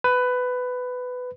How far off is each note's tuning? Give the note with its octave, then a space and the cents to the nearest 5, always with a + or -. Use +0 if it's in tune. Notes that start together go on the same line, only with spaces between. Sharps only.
B4 +15